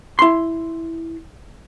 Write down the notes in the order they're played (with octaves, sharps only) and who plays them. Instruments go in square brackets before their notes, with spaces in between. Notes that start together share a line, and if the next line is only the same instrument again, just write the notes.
[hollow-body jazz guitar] E4 C6